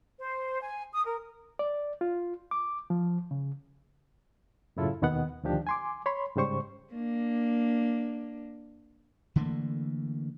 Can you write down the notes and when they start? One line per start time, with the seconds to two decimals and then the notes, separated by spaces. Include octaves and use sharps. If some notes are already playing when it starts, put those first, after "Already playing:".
0.19 C5
0.62 G#5
0.93 D#6
1.05 A#4
1.59 D5
2.01 F4
2.51 D6
2.90 F3
3.31 C#3
4.77 F#2 A2 C#3 E4 F4 A4
5.02 D#2 B2 D#3 B3 D#5 F#5
5.44 D2 B2 D#3 F3 D4 G4
5.67 G#5 C6 D6
6.06 C#5 B5 C6
6.36 G#2 C#3 G3 C5 C#6
6.93 A#3 D4
9.36 D3 E3 A3 A#3